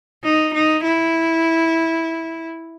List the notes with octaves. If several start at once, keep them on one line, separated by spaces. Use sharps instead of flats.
D#4
D#4
E4